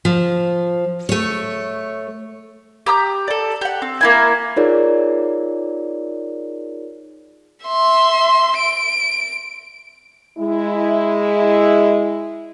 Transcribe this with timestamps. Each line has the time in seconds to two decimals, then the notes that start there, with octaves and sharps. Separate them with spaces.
0.05 F3
1.09 A3 C#5
2.86 G4 A#5 D#6 G6
3.28 A4 D5
3.61 G4 F#5
3.82 C4
4.01 A#3 E4 G#5
4.56 D#4 F4 G#4 A#4 C#5 D5
7.66 E5 C6
8.58 D7
10.38 G#3 E4